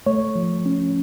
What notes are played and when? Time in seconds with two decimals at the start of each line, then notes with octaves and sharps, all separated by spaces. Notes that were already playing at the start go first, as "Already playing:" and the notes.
0.06 A3 C#5
0.36 F3
0.66 C#4